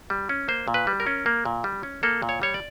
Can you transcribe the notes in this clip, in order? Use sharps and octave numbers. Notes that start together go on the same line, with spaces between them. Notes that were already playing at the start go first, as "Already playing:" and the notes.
G3
C#4
A#3 C5
A#2
B4
G3
A#4
C#4
A#3
A#2
G3
C#4
A#3 A4
A#2
C#5
G3 C#5
D5